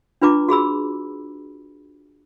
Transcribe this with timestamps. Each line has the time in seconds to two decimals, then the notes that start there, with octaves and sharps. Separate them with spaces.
0.22 D4 F4 B4 A#5 D6
0.49 F#4 G#4 B5 E6